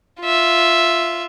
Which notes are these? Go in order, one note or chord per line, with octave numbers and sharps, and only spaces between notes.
F4 E5